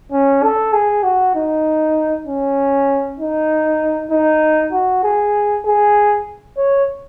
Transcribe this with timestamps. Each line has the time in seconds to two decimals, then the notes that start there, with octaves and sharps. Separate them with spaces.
0.12 C#4
0.43 A4
0.73 G#4
1.04 F#4
1.36 D#4
2.27 C#4
3.20 D#4
4.11 D#4
4.73 F#4
5.04 G#4
5.66 G#4
6.57 C#5